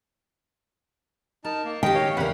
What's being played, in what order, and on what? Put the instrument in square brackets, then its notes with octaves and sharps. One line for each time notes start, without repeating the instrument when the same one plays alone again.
[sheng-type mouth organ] D#4 A5 [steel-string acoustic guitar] A#4
[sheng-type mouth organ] A#3
[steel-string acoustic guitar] D#3 G4 [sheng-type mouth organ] D#5 [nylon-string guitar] G5
[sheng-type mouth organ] C#5 F5
[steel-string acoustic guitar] E2 C#3 A#4 [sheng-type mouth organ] B4 F#5 B5